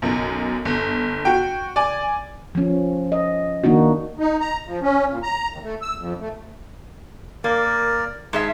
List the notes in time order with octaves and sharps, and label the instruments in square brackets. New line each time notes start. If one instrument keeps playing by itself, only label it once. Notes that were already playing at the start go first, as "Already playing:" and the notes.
[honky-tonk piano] B1 F#2
G1
F#4 G5
D5 G#5
[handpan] F3 C#4
D#5
D#3 A#3 D4 D#4 F#4
[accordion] D#4
A#5
F3
C#4
A#2
A#5
D#2
A3
E6
F2
A3
[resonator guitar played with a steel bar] A#3 [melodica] A#4 D5
[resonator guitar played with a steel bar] G#2 G#4 E5 [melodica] A5